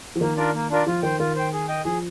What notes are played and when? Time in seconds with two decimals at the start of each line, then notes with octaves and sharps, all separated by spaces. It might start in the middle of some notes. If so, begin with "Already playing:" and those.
0.16 F3
0.21 D#3 A#3
0.37 D4 F4 A#4 D5
0.54 A#3
0.70 D4 F4 A#4 D5
0.87 F3 F4
1.02 D#3 C5 G5
1.19 D#3 F4
1.36 C5 G5
1.53 G#4
1.68 D#5 G5
1.85 F3 G#4